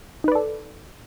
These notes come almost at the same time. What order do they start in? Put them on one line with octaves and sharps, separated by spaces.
D#4 B4 D5 A4